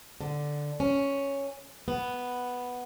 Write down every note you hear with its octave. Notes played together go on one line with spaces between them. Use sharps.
D3
C#4
B3